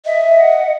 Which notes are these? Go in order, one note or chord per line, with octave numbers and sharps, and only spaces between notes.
D#5 E5
F#5